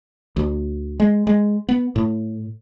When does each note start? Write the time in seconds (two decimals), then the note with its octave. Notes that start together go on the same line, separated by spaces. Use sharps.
0.36 D2
1.00 G#3
1.27 G#3
1.69 B3
1.96 A2